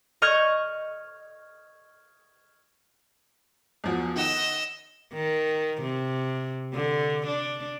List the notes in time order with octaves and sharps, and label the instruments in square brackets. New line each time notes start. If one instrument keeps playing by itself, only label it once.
[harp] D#5 C#6 F6 G6 G#6 C#7
[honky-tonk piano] E2 F3 F#4
[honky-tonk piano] D#3 F#5 [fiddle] D#5 E6
[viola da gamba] D#3
C3
D3
D4